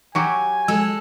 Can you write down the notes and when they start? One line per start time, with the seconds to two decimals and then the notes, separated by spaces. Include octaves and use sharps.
0.15 F#3 F#4 G4 G#5
0.68 G#3 A4 E6